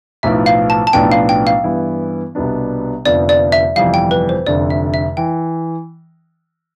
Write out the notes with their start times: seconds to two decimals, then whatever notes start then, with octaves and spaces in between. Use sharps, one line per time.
0.23 B1 A2 F3 B3 E5
0.46 F5
0.70 A5
0.87 A5
0.93 B1 A2 F3 B3 D4 G5
1.12 F5
1.29 G5
1.47 F5
1.64 G2 E3 B3 E4
2.35 C2 B2 G3 B3 D4
3.05 F1 F2 D3 F3 B3 D5
3.29 D5
3.52 E5
3.76 G1 F2 C3 E3 G3 F5
3.94 G5
4.11 B4
4.29 C5
4.47 F1 F2 D3 D5
4.70 E5
4.94 E5
5.17 E3 G5